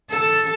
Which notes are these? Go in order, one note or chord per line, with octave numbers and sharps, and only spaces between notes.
A4